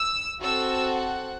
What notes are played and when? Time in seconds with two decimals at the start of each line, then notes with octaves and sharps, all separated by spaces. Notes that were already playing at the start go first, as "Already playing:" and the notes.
Already playing: E6
0.41 C4 F#4 A4 E6
0.96 F#5